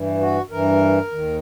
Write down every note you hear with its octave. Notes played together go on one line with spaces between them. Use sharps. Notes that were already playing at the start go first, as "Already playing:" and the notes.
Already playing: G2 E3
F#4
G2 E3 A#4
D#2 D#3